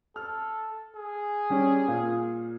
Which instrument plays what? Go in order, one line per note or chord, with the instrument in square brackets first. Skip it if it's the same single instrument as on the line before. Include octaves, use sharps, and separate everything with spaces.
[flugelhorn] A4 [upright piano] F6
[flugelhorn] G#4
[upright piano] G3 C#4 G4
A#2 F5